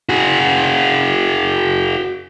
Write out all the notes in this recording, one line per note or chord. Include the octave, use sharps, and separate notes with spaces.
F#4 G#4